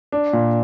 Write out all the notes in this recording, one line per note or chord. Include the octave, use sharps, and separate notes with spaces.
D4
A#2